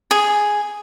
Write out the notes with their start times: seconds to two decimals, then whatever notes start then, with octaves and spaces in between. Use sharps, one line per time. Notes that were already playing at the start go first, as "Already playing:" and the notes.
0.11 G#4